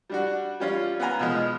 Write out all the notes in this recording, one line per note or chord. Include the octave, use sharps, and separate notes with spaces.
G3 D4 F#4
G3 C#4 F4
B3 F5 F#5 G#5 A#5
B2 F3 G#3